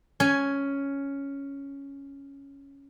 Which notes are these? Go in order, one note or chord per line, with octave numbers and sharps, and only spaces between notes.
C#4 G#5